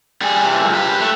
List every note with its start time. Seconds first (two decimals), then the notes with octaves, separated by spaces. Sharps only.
0.21 G3 G#4
0.44 C3 E3
0.59 C#2 F#2
0.74 G4 B4
1.00 A3